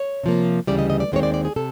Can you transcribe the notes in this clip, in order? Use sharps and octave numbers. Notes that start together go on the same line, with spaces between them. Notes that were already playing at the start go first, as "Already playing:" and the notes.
Already playing: C#5
C3 F3 A#3
D2 C#3 E3 G3 D5
D#5
D#5
D5
D#2 D#3 G#3 C4 C#5
D5
D5
G#4
C3 A4